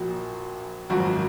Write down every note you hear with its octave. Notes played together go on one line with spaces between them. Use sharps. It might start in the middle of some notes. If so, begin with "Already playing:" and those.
Already playing: A#1 A#2 F3 F#4
G#1 F#2 F3 F#4